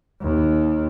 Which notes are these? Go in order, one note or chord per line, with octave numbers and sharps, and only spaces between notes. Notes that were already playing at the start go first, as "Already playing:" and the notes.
D#2